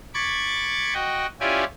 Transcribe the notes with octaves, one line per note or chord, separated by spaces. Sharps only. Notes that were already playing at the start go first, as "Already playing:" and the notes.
B5 C#6 D6 G#6 A6
F#4 D#5 G5
C#4 E4 F4 G4 D5 G#5